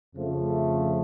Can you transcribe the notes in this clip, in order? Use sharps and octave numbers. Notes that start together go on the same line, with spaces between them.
F2 C#3 F3 A3